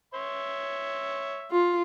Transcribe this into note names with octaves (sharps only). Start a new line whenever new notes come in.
C#5 E5 C6
F4